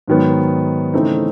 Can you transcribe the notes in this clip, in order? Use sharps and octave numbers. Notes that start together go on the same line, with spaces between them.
G#2 D#3 F#3 B3
C#3 E3 A3 C4 D#4